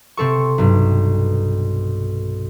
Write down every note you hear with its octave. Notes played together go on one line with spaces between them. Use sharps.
C3 C4 A4 C#6
B1 G2